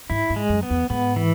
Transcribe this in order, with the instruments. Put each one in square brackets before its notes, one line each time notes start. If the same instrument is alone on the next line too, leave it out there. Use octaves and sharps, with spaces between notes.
[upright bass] G#2 [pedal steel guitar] E4
[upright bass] G#2
[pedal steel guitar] G#3
[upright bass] F#2
[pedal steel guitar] B3
[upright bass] E2
[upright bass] G#2 [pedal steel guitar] B3
[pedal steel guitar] E3